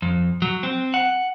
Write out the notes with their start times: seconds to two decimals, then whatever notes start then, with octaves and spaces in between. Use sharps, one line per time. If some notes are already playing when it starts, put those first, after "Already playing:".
0.02 F2
0.42 F#3
0.63 C4
0.94 F#5